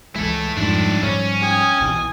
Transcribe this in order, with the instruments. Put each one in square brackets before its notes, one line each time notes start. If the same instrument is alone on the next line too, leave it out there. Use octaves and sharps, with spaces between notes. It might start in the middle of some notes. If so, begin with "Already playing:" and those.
[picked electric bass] C#2 E3 G#3 [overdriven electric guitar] E4 A4
[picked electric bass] F2 [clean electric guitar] G#2 F3 G3 [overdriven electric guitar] D4 E4
[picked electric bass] G#2 F3 G3 [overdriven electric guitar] C#4 [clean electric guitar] C#5
[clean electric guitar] G4 [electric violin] G#5 D#6
[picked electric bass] B1 B2 E3